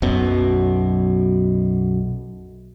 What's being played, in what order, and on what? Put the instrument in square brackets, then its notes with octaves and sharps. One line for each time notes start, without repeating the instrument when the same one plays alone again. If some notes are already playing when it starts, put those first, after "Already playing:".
[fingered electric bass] B1 F#2 B2